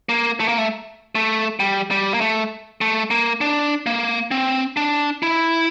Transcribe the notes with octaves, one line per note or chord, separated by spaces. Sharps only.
A#3
A3
A#3
A3
A3
G3
G3
A#3
A3
A3
A#3
D4
A#3
C4
D4
E4